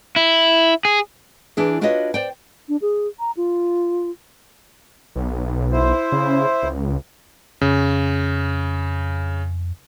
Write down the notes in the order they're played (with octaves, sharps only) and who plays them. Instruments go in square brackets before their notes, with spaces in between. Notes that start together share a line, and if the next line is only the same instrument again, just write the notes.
[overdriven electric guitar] E4
G#4
[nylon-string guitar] E3 D4 G#4
D4 F4 F#4 B4 C#5 D#5
C5 D5 G5
[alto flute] D4
G#4
A#5
F4
[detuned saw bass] B1
[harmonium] E4 C5
[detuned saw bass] C#3
C#2
[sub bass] F2 [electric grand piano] C#3